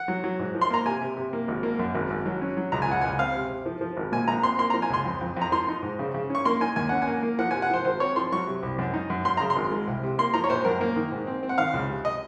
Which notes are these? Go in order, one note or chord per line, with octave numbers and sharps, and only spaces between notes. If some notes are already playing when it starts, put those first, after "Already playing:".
Already playing: F#5
F#3
F#3
G#2
F3
C6
A#3 A#5
C3 G#5
C3
C3
A#3
G#1
A#3
F#2
G#1
G#1
F#3
C#4
F#3
C#2 A#5
G#5
C#2 F#5
C#2 G#5
C4 F5
C3
C3
F3
F3
G#1
A#2 G#5
A#1 A#5
C4 C6
A#3 C6
A#5
F3
G#5
C#2 C6
F2
F2
F2 A#5
F3 C6
D#4
G#2
C#3
C#3
C#4 C#6
A#3 C6
D#4 G#5
D#2 G#5
C#4 F#5
G#5
A#3
A#3
F3 F#5
G#5
C3
F#5
F3 C5
G#1 C5
C4 C#5
F3 C6
F#3 C#6
C3
C2
F#2
D#4
F#2
F#2 C6
C#3 A#5
C6
G#1
G#3
C2
C3
A#3 C6
F3 A#5
C#5
A#1 C5
F#2 A#4
A#3
D#3
G#2
C4
C4
F#5
D#3 F5
C#2
C3
D#5